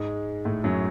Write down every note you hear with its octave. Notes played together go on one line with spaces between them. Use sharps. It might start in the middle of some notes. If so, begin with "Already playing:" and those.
Already playing: G#2 G#3
A2 A3
F#2 F#3